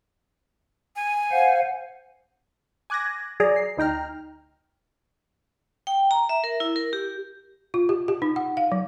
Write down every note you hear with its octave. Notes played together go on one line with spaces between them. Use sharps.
G#5
C5 F5 F#5
G#5 D6 F#6 G#6 A#6
F#3 G#4 D5 A#5
C7
D2 D#4 G5 A#5 F6
G5
A#5
E5
A#4
E4
A#4
G4
F4
G4
G4
D#4
F#5
F5
F#3